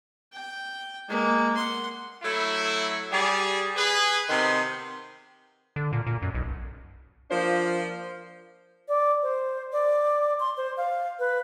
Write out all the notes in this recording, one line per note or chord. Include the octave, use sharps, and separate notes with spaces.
G5
G#3 A#3
F#5 C6
F#3 A3 E4
G3 G#4
G#4 B4
C3 D#3 B3 C6
D3
A#2
A#2
F#2
B1
F3 A#3 D4 F4 C5
D5
C5
D5
C6
C5
F5
B4